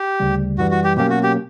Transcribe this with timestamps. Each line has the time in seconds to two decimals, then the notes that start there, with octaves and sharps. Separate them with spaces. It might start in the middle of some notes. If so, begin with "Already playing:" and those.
Already playing: G4
0.20 D2 C#3 G3
0.58 F#2 E3 G3 F#4
0.71 F#4
0.84 G4
0.97 B2 F#3 A#3 C#4 G4
1.10 F#4
1.23 G4